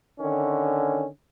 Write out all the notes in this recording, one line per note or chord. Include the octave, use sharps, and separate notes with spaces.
D3 D#3 C#4